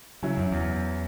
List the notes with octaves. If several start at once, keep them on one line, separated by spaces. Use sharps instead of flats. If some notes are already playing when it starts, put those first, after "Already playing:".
C#3 F#3 C#4 E4
F#2
E2